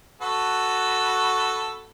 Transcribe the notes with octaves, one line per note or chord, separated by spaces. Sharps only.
F#4 A4 B4